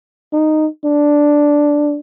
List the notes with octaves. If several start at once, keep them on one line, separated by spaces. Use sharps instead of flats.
D#4
D4